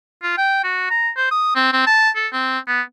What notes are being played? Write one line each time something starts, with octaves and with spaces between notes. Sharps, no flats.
F4
G5
F#4
A#5
C5
D#6
C4
C4
A5
A4
C4
B3